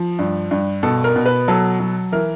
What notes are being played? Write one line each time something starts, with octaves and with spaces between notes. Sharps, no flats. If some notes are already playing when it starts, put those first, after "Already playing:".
Already playing: F3
G2
G2
B2 A4
A#4
B2
B4
F#3 A4
F#3
E3 A#4